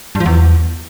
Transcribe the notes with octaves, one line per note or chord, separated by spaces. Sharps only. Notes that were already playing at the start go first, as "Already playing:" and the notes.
G2
F3
E2